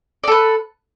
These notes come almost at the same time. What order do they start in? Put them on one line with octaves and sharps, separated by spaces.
D5 A4 B4